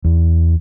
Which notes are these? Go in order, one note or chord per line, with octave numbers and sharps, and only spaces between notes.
E2